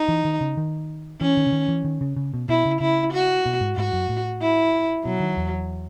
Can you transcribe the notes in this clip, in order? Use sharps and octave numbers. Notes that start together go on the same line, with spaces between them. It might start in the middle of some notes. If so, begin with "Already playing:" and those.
Already playing: D#4
E3
D#3
C#3
D#3
E3 C#4
D#3
C#3
D#3
E3
D#3
C#3
C#3
B2
B2 E4
C#3
C#3 E4
F#4
B2
G#2
G#2 F#4
F#2
A2
E4
B2 F#3
D#3
E2